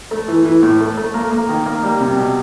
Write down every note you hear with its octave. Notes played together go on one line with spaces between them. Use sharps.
A3
E3
E3
A2
A3
A3
A#3
A#3
D#3
A#3
G3
C3
B2